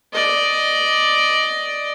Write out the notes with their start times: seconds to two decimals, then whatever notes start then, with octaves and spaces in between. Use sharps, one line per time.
0.13 D5 D#5